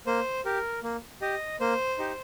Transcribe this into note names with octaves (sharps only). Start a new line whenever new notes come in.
A#3 C5
G4 A#4
A#3
G4 D#5
A#3 C5
D#4 G4